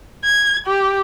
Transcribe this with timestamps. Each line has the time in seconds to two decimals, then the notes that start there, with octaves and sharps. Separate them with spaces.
0.25 G#6
0.67 G4